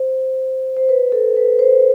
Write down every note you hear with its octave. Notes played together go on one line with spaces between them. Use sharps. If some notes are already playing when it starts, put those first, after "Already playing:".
Already playing: C5
C5
B4
A4
B4
C5